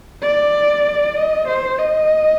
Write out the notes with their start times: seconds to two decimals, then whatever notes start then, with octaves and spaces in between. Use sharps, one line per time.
0.22 D5
1.16 D#5
1.48 C5
1.78 D#5